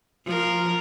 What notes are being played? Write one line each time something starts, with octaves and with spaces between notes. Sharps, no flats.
F3 A#4